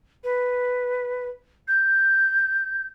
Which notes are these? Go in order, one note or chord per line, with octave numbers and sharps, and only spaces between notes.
B4
G6